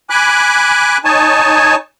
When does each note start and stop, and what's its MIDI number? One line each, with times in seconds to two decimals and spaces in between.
0.10 0.97 80
0.10 0.97 83
0.10 0.97 86
0.10 0.97 90
1.05 1.76 63
1.05 1.76 73
1.05 1.76 80
1.05 1.76 81